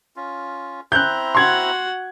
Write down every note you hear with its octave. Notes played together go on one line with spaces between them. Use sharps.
C#4 F4
C4 E4 A#5 F#6 G6
F#4 F#5 C6 G#6